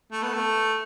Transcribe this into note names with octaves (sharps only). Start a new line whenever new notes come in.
A3
B3
A3